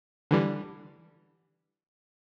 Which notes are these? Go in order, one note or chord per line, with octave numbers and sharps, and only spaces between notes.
D3 E3 G3